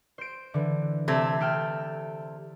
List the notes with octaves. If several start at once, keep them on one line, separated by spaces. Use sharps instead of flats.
C5 D7
D3 E3
C3 A3 G#6
A4 G5 F6